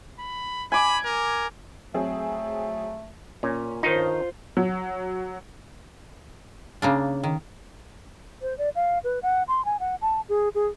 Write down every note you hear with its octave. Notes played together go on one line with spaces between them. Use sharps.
B5
G#5 B5 D6
A#4
F#3 A3 C4 G#4
A#2 C#4
G2 D#3 D#4 F4 C5
F#3
C#3 A#3 D4
D#3
C5
D5
F5
B4
F#5
C6
G#5
F#5
A5
G#4
G#4